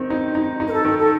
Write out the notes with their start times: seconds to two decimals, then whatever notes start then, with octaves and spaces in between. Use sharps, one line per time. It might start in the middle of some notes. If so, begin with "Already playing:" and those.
Already playing: D#3 C4 D#4
0.10 D#4
0.35 D#4
0.60 D#4
0.67 A#4
0.72 A4
0.85 D#3
0.98 A4